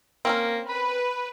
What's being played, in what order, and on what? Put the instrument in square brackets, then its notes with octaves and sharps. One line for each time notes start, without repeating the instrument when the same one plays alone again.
[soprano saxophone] A#3 [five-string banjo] C4 C#4 A#4
[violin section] B4 [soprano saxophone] B5